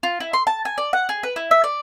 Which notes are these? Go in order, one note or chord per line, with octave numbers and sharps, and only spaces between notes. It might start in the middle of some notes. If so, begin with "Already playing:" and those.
F4
E4
C6
A5
G#5
D5
F#5
G#4
B4
E4
E5
D5